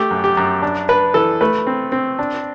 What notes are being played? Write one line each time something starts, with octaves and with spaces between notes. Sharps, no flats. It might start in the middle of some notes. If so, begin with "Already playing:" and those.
Already playing: A3 G4
F#2
G4
F#2
D4
D4 B4
E3 A4
A3 B4
C4
C4
D4